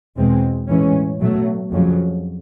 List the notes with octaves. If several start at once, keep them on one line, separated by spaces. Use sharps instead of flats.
E2 B2 G#3 C4
A2 E3 G#3 C#4
B2 F#3 A3
F2 C#3 F#3